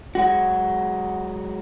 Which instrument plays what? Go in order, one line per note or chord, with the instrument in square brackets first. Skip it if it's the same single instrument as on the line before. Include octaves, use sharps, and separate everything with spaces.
[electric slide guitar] F#3 G#3 F#4